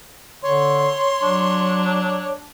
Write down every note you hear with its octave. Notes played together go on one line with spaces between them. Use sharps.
D3 C#5 C6
F#3 D4